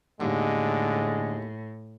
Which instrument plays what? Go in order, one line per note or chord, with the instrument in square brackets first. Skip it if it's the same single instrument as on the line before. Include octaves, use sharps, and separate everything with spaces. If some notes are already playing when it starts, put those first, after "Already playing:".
[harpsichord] D#2 [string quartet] A2 [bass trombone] D3 [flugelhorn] G#3